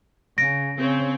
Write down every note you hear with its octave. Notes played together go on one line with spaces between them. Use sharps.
C#3 A#6 D7
C#3 C4 C#5